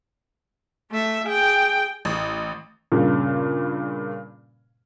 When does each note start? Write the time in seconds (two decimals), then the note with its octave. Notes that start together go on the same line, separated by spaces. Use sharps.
0.91 A3 E5
1.27 G#4 G5
2.05 A1
2.92 G2 A#2 C#3